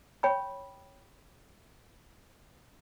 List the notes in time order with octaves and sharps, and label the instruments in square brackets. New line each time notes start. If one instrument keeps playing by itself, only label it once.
[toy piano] C#5 G5 B5 C#6